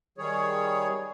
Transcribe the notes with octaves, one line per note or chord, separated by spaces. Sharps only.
D#3 G3 G#4 C#5